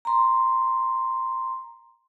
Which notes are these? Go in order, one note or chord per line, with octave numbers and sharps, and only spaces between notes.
A#5 C6